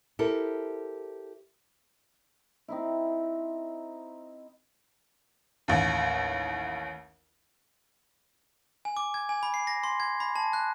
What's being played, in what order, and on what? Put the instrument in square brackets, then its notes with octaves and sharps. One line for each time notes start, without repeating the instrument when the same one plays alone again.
[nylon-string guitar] E4 G4 A4 A#4 C5
[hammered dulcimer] C4 D#4 E4
[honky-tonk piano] A1 D#2
[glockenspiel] G#5
D6
G#6
G#5
B5
C7
A#6
C6
G#6
B5
A5
F#6